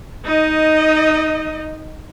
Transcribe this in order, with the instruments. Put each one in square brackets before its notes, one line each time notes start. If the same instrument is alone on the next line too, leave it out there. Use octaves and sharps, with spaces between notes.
[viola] D#4 D#5